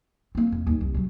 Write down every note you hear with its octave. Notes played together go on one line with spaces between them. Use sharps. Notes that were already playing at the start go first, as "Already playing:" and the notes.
A#3 C4
F2
D#2
C2
C#3 F#3